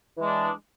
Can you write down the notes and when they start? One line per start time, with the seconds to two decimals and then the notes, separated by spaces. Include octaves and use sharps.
0.18 E3
0.21 G#3
0.24 D4